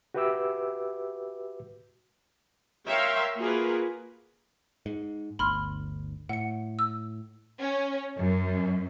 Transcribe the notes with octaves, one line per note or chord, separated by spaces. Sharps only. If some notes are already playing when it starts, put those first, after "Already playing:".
F#4 G4 B4 E5 D6 E6
A#4 C#5 E5 F5 G5 C6
A#3 F4 F#4 G#4 A#4 B4
G#2
G1 D2 B5 C6 F6
A2 F#5 C#7
E6
C#4
F#2